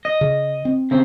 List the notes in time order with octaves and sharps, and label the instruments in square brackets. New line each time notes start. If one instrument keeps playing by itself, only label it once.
[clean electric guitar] D#5
[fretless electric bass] C#3
C4
[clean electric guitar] C#3 C4